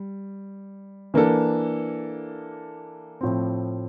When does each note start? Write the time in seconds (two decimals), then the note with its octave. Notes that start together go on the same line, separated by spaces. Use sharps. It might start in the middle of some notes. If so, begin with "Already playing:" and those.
Already playing: G3
1.14 E3 A#3 D4 A4
3.21 A2 F3 C4